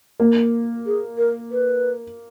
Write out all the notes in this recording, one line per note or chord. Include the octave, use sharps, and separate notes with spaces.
A#3
G#4
A#4
B4